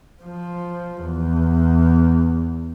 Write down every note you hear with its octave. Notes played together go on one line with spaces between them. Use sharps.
F3
E2